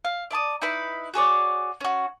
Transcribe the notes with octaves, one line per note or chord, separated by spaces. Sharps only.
F5
D5 E5 A5 D#6
D#4 E4 B4 B5
F#4 G#4 C#5 D5
C#4 F#4